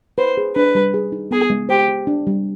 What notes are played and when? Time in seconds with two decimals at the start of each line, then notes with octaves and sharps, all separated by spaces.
0.18 B4 C5
0.37 G#4
0.55 D4 B4
0.75 G3
0.94 G#4
1.12 D#4
1.31 B3 G#4
1.50 G#3
1.69 G4 C5
1.88 G4
2.07 D4
2.27 G3